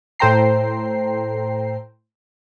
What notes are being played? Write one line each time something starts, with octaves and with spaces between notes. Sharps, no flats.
A2 A4 C5 G5 A#5 C7